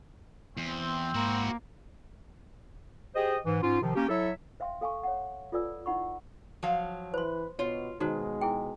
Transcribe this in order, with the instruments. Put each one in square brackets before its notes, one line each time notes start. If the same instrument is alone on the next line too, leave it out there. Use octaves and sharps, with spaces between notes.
[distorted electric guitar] E2 [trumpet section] C4
[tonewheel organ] G#2 [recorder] A#3 [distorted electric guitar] E4 F#4
[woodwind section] G4 G#4 C5 D#5
G#2 E3
G#2 C#4 F4
C3 D#3 F3
A#3 C#4 G4
F#3 E4 A4 C#5 E5
[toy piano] C5 E5 F5 G5 C6
A4 F5 G#5 A5 C#6
C#5 F#5
F4 A4 B4 D5 G#5 E6
D#4 E4 F#5 B5 C#6
[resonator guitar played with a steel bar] F3 F#3 F5
[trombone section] E3 B4 [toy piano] C5 C6
[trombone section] B2 [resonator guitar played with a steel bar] F4 [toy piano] C#5
[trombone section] B2 G#3 [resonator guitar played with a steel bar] D#3 [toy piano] D#4 F#4 C5
[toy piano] E4 G#4 G5